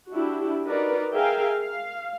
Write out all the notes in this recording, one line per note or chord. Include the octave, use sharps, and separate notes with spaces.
D4 E4 F#4 G4
D#4 F#4 A#4 B4 D5
G#4 A#4 E5 F5 G5 G#5
F5